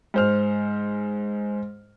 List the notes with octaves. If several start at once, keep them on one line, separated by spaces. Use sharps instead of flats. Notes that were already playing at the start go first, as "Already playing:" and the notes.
G#2 C5 F6